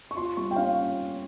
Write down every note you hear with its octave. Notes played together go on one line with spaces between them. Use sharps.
C#6
F4 C6
G3 C#6
G5
C#4 F5